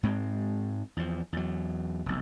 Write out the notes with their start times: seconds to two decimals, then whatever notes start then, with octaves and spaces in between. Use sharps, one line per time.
0.03 G#2 G#3 C4
0.97 E2 F3
1.33 E2 F#3
2.06 F1 B1